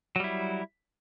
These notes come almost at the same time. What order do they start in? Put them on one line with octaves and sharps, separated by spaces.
F#3 G3 E4